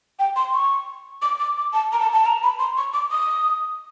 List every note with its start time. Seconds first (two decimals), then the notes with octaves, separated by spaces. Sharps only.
0.19 G5
0.36 C6
0.54 C#6
1.22 D6
1.40 D6
1.57 D6
1.73 A5
1.92 A#5
2.00 A5
2.13 A5
2.26 A#5
2.43 B5
2.59 C6
2.77 C#6
2.93 D6
3.11 D#6